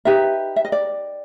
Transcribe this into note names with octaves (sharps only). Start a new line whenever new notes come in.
D#4 G4 B4 E5
E5
D#5
D5